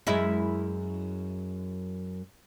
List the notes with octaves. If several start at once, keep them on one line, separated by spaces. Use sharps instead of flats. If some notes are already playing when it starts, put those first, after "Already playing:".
F#2 G#3 E4